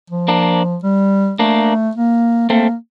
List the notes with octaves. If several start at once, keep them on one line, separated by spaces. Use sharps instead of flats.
F3
A#3 D4
G3
A3 A#3 D4
A#3
A3 A#3 C4